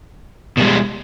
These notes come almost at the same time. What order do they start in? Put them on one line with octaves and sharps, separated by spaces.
B2 G3 G#3